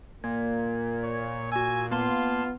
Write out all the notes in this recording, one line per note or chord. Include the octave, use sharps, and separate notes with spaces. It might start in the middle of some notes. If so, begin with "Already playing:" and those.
A#2 A#3 G#6
C#5
F#4 G#5 E6
A#3 B3 F4 A5 C6